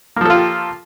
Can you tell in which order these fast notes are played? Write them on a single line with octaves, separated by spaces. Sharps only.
A#3 F3 A4 F4 G4